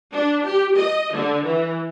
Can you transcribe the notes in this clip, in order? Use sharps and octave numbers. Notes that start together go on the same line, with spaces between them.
D4
G4
D#5
D3
E3